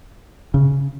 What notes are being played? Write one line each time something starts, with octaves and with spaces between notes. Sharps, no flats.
C#3